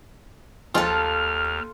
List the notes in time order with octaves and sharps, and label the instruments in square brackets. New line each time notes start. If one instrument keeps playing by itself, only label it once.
[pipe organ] D#2 [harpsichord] F3 G#3 C4 [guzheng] F4 A4 [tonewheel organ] F6